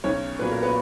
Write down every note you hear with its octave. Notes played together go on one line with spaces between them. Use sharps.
B1 C#4 C#5
A#2 F#3 B3 B4
A#4
B3 B4